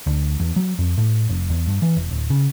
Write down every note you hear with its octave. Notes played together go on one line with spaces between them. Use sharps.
D2
E2
F#3
F2
A2
F1
E2
G2
E3
E1
D1
C#3